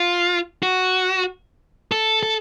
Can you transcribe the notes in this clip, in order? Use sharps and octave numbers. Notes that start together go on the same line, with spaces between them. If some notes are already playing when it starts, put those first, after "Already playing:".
Already playing: F4
F#4
A4
A4